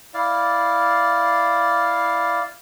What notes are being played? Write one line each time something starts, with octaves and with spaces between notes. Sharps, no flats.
E4 D5 F5